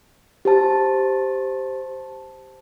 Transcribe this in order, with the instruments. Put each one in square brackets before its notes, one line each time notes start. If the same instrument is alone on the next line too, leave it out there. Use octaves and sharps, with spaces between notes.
[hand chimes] G4 C5 A5